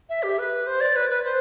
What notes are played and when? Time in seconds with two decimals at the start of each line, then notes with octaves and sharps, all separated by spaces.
0.09 E5
0.23 G4
0.38 B4
0.67 C5
0.81 D5
0.96 B4
1.10 B4
1.24 C5